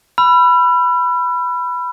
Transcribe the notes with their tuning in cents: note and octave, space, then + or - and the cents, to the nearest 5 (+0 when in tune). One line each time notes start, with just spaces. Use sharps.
B5 +0 E6 +45